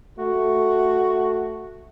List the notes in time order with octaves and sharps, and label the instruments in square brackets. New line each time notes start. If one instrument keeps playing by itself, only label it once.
[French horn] A3 [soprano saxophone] F#4